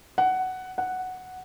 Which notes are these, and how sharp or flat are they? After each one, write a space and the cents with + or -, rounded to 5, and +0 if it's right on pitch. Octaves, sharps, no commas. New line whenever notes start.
F#5 +10
F#5 +0